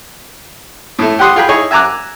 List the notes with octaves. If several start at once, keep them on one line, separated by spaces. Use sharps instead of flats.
A2 A3
G4 F#5 C6 D#6
F4 G#4 G5 B5
D#4 E4 G#4 C#5 D#5
E5 G#5 A#5 D6 F#6